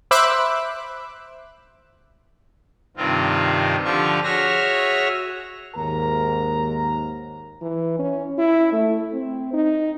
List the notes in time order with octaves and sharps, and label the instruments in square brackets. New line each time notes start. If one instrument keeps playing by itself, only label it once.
[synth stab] C5 E5 B5 D6 E6 F#6
[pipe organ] G2 C3 D#3 C4 F4
D3 F3 F4 G4 C#6
F#4 G#4 C#5 E5 F6 A#6
[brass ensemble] D#2 G#2 A#4 A#5
[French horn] E3
C#4
E4
A3
C4
D#4